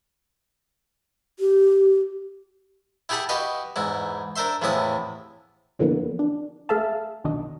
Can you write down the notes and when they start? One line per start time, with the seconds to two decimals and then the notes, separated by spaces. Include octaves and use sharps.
1.39 G4
3.09 E4 G4 G#4 F#5 A5 B5
3.29 F#4 G4 B4 D#5 F5
3.76 E2 G#2 E4
4.36 D4 A#4 C5 E5 C6
4.62 E2 A2 C3 F3 E4 D#6
5.79 F2 D3 E3 F#3 A#3 B3
6.19 D4
6.69 A3 G#4 A4 E5 F5 A5
7.24 B1 D#3 F#3 D4 D#4